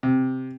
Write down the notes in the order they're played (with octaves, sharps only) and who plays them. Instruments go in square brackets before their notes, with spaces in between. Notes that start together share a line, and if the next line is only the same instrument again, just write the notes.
[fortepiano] C3